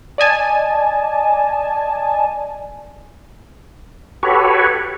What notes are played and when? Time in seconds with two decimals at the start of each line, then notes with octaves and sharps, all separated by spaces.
0.18 D5 D#5 G#5 A5
4.23 F#4 G4 A4 B4 C#5